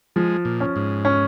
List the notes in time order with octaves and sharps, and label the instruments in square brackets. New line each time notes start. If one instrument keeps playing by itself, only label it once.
[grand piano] F3 [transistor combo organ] G#3
[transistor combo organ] A#2
[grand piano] C#4
[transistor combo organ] G#2
[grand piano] C#4